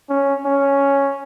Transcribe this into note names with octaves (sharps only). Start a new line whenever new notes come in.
C#4
C#4